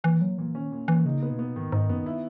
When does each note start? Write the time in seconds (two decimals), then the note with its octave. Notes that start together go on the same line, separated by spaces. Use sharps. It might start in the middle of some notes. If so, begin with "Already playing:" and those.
0.04 A#2 E3
0.21 A#2 F#3
0.38 A#2 E3
0.55 D#3 C#4
0.72 A#2
0.88 A#2 E3
1.05 C#3 D#4
1.22 B3
1.31 B2
1.39 B3
1.56 G#2 D#3
1.72 G#2 D#4
1.89 F#2 B3
2.06 E4